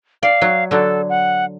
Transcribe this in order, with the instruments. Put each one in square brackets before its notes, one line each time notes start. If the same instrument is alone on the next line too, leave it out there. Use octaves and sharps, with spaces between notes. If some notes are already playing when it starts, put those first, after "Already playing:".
[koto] D5 [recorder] F5
[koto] F#3
[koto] D3 F#3 [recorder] A4
[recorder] F#5